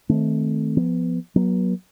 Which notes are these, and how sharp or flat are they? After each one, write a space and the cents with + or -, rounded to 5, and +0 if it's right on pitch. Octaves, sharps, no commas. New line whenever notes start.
D#3 +10 A3 -10 C4 +0
F3 +5 B3 +0
F#3 +0 B3 -40